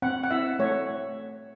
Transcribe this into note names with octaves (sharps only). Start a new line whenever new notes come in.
C4 F#5
F#5
E4 E5
A3 C#5